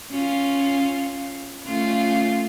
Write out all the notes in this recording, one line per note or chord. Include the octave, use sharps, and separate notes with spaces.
C#4 F4
A3 C#4 F4